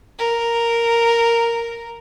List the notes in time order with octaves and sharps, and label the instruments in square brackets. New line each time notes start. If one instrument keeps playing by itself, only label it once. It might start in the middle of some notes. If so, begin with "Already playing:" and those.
[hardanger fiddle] A#4